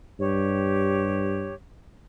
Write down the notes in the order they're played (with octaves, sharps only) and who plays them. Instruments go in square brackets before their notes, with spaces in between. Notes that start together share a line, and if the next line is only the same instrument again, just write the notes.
[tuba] G2 [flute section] G4 C#5